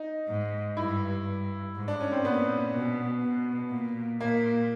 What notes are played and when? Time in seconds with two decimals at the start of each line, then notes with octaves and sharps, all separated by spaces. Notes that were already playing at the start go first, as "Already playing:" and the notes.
Already playing: D#4
0.28 G#2
0.77 G2 E4
1.27 G2
1.76 G#2
1.88 D4
2.00 C#4
2.12 C4
2.25 A#2 B3
2.73 B2
3.23 B2
3.71 A#2
4.21 A#2 A#3